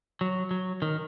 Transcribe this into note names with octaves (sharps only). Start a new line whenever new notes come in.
F#3
F#3
D#3